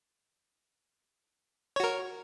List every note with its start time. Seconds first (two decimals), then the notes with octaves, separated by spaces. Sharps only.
1.76 C#5
1.80 F#4
1.84 A#4